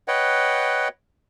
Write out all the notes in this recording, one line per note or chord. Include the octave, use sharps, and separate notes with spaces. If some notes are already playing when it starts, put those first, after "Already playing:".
B4 C#5 D#5 F#5 G5